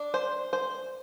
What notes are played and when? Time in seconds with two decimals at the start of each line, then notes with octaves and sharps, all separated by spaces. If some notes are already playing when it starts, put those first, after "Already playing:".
Already playing: D4
0.14 C5
0.53 C5